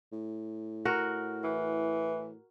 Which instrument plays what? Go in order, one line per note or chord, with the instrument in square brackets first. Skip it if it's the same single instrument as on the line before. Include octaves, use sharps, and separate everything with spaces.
[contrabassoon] A2
[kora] F#4 A#4
[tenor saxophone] E3